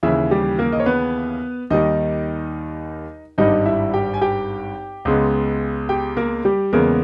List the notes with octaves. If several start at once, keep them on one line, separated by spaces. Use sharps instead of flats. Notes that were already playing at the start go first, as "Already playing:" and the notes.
D#2 C#3 E3 E4 E5
G3 G4
A#3 A#4
D#5
C#5
B3 B4
D#2 D#3 G3 D#4 D#5
G#1 G2 G3 D#4 D#5
E4 E5
G4 G5
G#5
G4 G5
C#2 C#3 G#3 B3
G4 G5
A#3 A#4
G3 G4
E2 C#3 G#3 A#3 B3 A#4